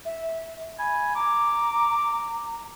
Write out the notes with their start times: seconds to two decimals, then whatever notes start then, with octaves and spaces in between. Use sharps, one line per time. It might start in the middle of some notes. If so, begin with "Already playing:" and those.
0.05 E5
0.79 G#5 B5
1.15 A#5 D6